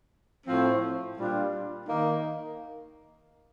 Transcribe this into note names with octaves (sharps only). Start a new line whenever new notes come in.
A2 F3 C4
A#2 G3 D4 F4
D#3 A#3 D#4